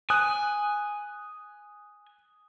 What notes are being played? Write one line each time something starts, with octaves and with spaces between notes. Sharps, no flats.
G#5 D#6 F#6